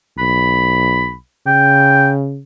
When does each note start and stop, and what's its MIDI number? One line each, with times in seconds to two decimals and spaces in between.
0.19 1.16 35
0.19 1.13 83
1.47 2.42 49
1.47 2.09 79